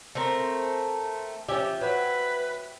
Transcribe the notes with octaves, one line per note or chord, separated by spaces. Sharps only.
A3 C4 A#4
F3 C#4 G4 E5 G5
F#3 B4